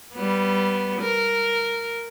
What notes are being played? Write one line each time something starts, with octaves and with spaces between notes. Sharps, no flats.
G3 B3
A#4